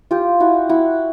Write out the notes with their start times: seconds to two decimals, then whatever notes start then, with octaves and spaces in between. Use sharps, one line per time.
0.11 F4 G4
0.40 E4 F#4
0.69 E4 F#4